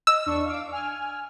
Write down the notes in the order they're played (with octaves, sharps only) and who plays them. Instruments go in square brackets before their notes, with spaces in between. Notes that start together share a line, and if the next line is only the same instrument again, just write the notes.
[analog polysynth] D#5 [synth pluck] E6
[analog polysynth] E2 D4 C#6
F5 D6
G#5 F6